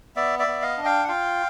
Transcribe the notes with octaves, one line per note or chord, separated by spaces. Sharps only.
B3 D5 E5
D5 E5
B3
D#5 F5
D4
F5 G5
F#5
F4 F5 G5